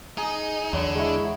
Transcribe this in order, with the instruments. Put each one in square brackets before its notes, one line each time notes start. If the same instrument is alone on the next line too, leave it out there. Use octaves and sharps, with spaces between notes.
[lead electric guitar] D#4 [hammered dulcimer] G#4
[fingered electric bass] E2 [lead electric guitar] D3 D4 [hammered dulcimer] F#3 B5
[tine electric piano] G#3 E4 [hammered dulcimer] C#6